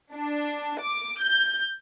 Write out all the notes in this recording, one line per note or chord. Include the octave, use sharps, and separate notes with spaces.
D4
D6
G6